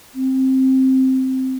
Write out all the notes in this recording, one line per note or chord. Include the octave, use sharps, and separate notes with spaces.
C4